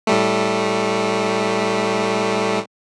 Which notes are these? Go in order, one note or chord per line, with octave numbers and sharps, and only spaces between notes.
A2 G3 A3